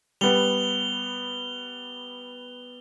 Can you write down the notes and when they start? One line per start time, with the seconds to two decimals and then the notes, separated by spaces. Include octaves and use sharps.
0.21 G3 B3 F7 G7